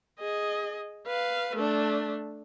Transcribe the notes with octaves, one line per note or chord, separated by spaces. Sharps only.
G#4 D#5
B4 F5
A3 D4